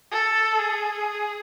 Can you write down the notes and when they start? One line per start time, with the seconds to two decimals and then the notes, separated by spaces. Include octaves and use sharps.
0.12 A4
0.59 G#4